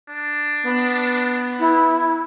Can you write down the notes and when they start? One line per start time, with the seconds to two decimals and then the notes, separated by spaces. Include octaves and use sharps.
0.10 D4
0.65 B3
1.59 E4